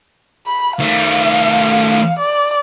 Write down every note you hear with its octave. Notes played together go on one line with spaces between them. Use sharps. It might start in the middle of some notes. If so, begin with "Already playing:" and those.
B5
D#3 A3 F5
D5